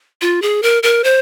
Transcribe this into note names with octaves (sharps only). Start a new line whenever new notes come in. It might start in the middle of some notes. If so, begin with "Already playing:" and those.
F4
G#4
A#4
A#4
C5